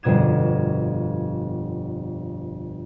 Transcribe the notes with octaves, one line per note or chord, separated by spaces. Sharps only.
G1 F2 B2 D#6 G#6 E7